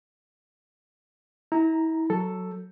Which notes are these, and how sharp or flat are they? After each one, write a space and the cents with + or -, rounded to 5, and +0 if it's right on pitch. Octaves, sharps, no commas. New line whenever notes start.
E4 -35 A#5 +0
F#3 +0 A4 +5